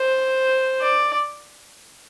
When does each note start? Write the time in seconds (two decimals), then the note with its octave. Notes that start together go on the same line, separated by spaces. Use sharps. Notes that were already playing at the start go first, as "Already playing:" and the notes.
Already playing: C5
0.82 D5